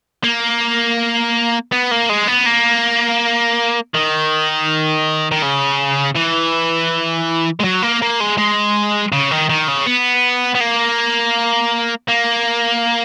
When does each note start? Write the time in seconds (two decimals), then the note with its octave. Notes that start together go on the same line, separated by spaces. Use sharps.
0.24 A#3
1.72 B3
1.91 A#3
2.09 G#3
2.28 B3
2.46 A#3
3.94 D#3
5.32 D#3
5.43 C#3
6.16 E3
7.60 G#3
7.64 F#3
7.82 A#3
8.02 A#3
8.20 G#3
8.38 G#3
9.12 C#3
9.31 D#3
9.49 D#3
9.68 C#3
9.86 B3
10.55 B3
10.61 A#3
12.08 A#3